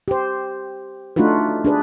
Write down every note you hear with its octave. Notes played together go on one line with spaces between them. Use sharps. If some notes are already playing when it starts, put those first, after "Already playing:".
G4 C5
A3 D4 D#4 F4 F#4 B4
D4 G#4 B4